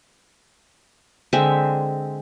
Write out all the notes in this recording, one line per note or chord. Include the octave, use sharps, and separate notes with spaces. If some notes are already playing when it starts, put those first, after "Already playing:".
D3 G#3 C4 E5